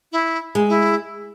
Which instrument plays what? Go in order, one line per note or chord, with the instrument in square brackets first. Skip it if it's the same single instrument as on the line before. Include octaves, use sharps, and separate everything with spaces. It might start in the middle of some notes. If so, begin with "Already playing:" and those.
[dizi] E4
[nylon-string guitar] G#3
[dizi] E4